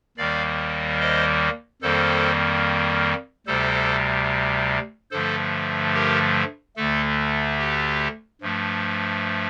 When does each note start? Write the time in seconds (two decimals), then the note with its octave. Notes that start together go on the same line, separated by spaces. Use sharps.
0.17 D#2 D#3 G3 A#3 D5 F5
1.00 C5 D#5
1.82 F2 D#3 G3 A#3 A4 C5
3.47 D2 C3 G3 A4 C5
5.11 G2 D3 F3 A3 A4 C5
5.94 G4 A#4
6.76 D2 D3 A3 A4
7.59 G4
8.41 G2 F3 A3